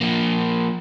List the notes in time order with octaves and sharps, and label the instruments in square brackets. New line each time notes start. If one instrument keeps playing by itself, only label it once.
[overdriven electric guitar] F3 A#3